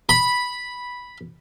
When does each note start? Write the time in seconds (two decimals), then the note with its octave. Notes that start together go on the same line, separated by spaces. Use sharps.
0.09 B5